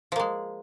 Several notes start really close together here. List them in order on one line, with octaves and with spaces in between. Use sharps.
F3 A#3 G#3